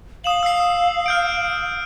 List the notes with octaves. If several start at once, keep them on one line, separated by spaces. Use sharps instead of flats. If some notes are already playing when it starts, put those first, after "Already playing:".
F5 D#6 E7 F#7
F5 E6 C7
F6 G6 D7